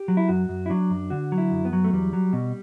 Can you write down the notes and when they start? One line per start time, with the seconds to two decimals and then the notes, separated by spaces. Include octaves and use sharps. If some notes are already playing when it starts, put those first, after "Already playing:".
Already playing: G4
0.08 F#3
0.17 E4
0.29 F#2 F#4
0.49 F#2
0.66 E4
0.70 F#3 D4
0.90 F#2
1.10 D3 F#4
1.32 F#3
1.38 E4
1.52 F#2
1.65 B3
1.73 F#3
1.84 A3
1.93 E2 G3
2.13 F#3
2.33 B2